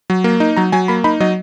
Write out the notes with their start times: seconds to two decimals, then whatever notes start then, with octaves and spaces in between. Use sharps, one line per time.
0.10 F#3
0.24 A#3
0.40 D#4
0.57 F#3 A#5
0.72 F#3 G#5
0.88 A#3 B5
1.04 D#4 B5
1.20 F#3 D#5